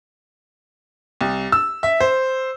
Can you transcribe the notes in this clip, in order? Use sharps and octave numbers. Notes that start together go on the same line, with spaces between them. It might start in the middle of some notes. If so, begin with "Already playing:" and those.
C2
E6
E5
C5